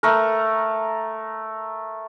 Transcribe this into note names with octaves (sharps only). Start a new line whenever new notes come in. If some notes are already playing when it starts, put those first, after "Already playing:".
A3 A#4